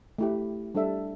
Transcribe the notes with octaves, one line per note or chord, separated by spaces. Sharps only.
A3 E4 G4
G3 D4 A4 E5